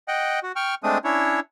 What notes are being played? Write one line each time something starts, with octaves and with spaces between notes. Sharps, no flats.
D#5 F#5 G5
F#4
G5 C#6 F6
G#3 A3 C4 D4 D#6
C#4 D4 E4 C#5